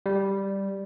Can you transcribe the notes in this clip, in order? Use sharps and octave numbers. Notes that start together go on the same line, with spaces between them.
G3